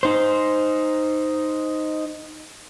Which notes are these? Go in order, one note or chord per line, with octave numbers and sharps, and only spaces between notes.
D#4 C5